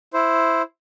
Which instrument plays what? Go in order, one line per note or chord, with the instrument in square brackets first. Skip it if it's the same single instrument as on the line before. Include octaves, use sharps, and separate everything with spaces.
[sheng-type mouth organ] E4 C5